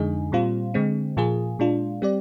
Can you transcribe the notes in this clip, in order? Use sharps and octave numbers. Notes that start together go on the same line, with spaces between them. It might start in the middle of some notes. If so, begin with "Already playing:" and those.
Already playing: F2 D3 G#3 D#4 G#4
A#2 G3 C4 F4
D3 G#3 C4
A#2 F3 A#3 F4 G#4
A#2 G#3 D4 F4
G3 C4 G4 D5